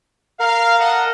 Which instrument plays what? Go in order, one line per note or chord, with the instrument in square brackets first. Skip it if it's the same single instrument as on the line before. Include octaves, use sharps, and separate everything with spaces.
[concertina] A#4 [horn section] F5
[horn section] A4 D#5 F#5